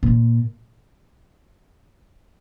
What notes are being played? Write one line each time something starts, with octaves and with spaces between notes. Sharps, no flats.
A#2